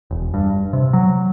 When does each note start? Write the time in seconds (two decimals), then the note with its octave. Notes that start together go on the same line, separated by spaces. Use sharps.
0.11 E1
0.34 G2
0.73 C3
0.93 F#3